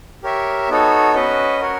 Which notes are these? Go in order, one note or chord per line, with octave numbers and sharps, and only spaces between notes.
G4 A#4 C#5 E5
B3 D#4 F#4 A4 C#5
C#4 F#4 B4 D#5
F#4 A#4 C#5 F#5